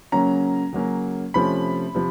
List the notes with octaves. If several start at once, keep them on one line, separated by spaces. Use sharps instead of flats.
C#3 F#3 A#3 C#4 A#5
C#3 F#3 A#3 C#4
C3 F3 A3 C#4 B5
C3 F3